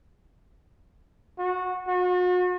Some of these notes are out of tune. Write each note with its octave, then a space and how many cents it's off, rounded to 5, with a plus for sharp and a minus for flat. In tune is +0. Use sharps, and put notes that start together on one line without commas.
F#4 -15
F#4 -40